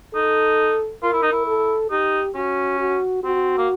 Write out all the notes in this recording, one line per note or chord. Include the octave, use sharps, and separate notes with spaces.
D#4 A4
F4 A#4
E4
D#4
E4
A4
D#4 G4
C#4 F#4
F#4
C4 F#4
A#3